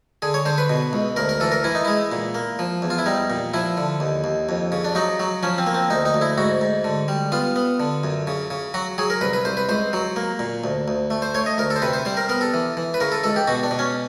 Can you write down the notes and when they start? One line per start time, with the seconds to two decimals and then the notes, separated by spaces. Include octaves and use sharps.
0.22 D3 G#4
0.34 C#5
0.45 D3 C5
0.58 B4
0.69 B2
0.93 C#2
1.16 D2 A#4
1.29 A#4
1.40 E3 A4
1.52 A#4
1.64 E3 E4
1.75 D#4
1.85 G#3 E4
2.12 A#2
2.35 A#3
2.59 F3
2.82 E2
2.90 F4
2.98 E4
3.06 G3 D#4
3.30 A#2
3.54 F3 E4
3.77 D3
4.00 D#2
4.24 D#2
4.49 F2
4.72 C#3
4.85 D4
4.95 F#3 D#4
5.20 F#3
5.43 F3 C#4
5.58 C4
5.67 A#3
5.74 C4
5.90 D2 D#4
6.05 D#4
6.14 D2
6.21 E4
6.38 G#2 F#4
6.61 G#2
6.84 D3
7.08 G3
7.32 B3 F4
7.56 B3
7.80 D3
8.04 F#2
8.27 C#3
8.50 C#3
8.74 F#3 F#4
8.98 F#3 G#4
9.10 A#4
9.21 C2 B4
9.33 B4
9.45 C2 C5
9.57 B4
9.69 C#2 C5
9.93 F#3
10.16 A#3
10.39 A#2
10.64 D2
10.88 D2
11.10 A3
11.22 C5
11.34 A3 C#5
11.46 D#5
11.58 D2 A#4
11.70 A4
11.76 C5
11.82 C3 B4
11.93 C5
12.05 G3 C5
12.17 A#4
12.29 B3 A#4
12.41 A4
12.54 E3
12.77 E3
12.94 B4
13.00 C#3 A#4
13.12 A4
13.24 C#2 A4
13.36 G4
13.47 B2 F#4
13.63 D4
13.71 B2
13.79 C#4